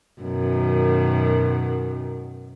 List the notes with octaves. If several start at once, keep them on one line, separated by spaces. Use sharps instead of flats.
F#2 B2 D#3